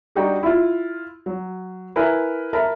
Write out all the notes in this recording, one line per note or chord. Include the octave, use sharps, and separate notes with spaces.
G3 D4 D#4 F#4 G5
E4 F4
F#3
E4 A#4 B4 G#5
A#4 E5 A5 B5